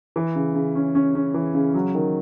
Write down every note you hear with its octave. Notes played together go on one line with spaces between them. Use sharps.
E3
C#3
C#3
C#4
C#4
C#4
E3
C#3
F#3
D#3